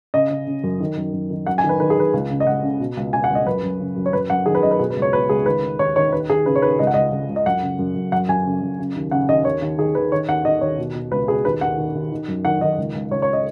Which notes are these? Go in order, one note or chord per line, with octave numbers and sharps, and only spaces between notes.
C#3 D#5
C#3
C#3
F#2
D#3
F#2
F#2
D#3
F#2 F#5
G#5
D#3
B4
D#3 B4
G#4
D#3 B4
C#2
C#3
D#5
C#2 F#5
C#3
B2
C#2
B2 G#5
F#5
C#2
D#5
F#2 B4
F#2
C#3
F#2
C#5
F#2 B4
F#2 F#5
D#3 G#4
B4
F#2 D#5
B4
B2 G#4
B4
C#2
C#5
B2 B4
C#2 G#4
D#3 B4
D#3
D#2 C#5
D#3 C#5
D#2 B4
D#2 G#4
C#3 B4
C#5
D#2 B4
C#2 D#5
F#5
C#2 D#5
C#2
C#2
D#5
F#2 F#5
C#3
F#2
F#2
F#2 F#5
F#2 G#5
C#3
F#2
C#3
D#2
C#3 F#5
D#2 D#5
D#2 C#5
D#2
D#3 G#4
D#3 B4
D#3 C#5
D#2 F#5
D#3 D#5
D#2 C#5
B2
B2
C#2 B4
B2 G#4
D#2 B4
D#2 F#5
D#3
D#2
D#3
F#2
D#3 F#5
D#3 D#5
C#2
C#2
C#2 C#5
C#5
D#5